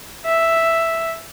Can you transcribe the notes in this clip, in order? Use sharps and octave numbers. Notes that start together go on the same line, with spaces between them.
E5